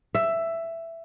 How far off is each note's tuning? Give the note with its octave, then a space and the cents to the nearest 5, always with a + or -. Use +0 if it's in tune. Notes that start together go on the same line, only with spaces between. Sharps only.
E5 +10